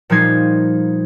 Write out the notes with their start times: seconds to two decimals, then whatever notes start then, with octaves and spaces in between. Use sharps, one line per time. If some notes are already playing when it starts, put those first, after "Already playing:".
0.10 A#2 F3 G3 D#4 G#6 C7